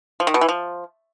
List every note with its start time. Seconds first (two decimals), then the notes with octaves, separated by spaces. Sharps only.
0.20 F3
0.27 D#3
0.34 B2
0.41 E3
0.49 F3